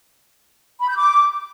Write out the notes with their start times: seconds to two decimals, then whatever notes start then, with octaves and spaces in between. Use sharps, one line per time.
0.81 B5
0.89 G6
0.97 D6